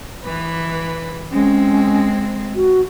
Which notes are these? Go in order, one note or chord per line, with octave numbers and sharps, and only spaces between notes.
E3 B4
G#3 C4 C#4
F#4